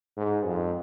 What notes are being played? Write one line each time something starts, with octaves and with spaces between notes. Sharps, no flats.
G#2
F2